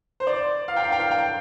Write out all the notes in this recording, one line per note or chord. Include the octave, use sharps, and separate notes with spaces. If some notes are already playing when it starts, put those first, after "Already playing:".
C5
D5
F5
G5
F5
G5
F5
G5